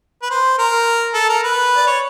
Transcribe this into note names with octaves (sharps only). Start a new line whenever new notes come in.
B4
C5
A#4
A4
A#4
B4
D5
C#5